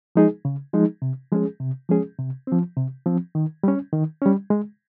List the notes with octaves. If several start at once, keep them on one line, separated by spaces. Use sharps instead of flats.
F3 G#3 D#4 G#4
C#3
F3 G#3 D#4 G#4
C3
F3 G#3 C#4 G#4
C3
F3 G#3 C#4 G#4
C3
F3 C4
C3
F3 C4
D#3
G3 C#4
D#3
G3 C#4
G#3